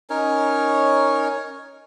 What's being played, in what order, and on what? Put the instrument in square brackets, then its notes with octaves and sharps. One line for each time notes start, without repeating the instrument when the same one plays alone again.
[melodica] C#4 D#4 A#4 C#5